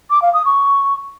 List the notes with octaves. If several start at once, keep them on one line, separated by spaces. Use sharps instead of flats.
D6
F5
D#6
C#6